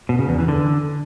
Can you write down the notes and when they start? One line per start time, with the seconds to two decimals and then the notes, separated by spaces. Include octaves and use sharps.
0.09 B2
0.19 C#3
0.29 E2
0.39 E3
0.48 D3